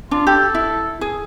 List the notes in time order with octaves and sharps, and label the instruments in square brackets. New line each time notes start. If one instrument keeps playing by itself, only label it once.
[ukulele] D4 [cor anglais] F4
[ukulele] G4 [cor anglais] A4
[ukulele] E4
G#4